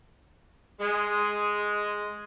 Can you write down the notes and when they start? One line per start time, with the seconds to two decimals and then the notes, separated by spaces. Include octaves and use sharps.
0.80 G#3